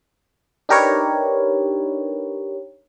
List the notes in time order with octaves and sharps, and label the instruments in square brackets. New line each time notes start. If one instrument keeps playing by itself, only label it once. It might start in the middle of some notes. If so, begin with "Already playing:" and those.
[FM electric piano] D4 D#4 G4 A#4 B4 C#5